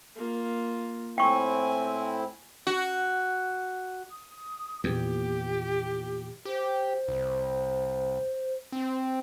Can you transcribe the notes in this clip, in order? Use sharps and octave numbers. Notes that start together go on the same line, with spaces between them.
A#3 F4
A2 C4 E4 G5 G#5 C#6
F#4
D#6
E2 A#2 E3 G4
G4 C5
C2
C4